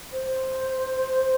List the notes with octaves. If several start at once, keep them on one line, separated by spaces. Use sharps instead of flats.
C5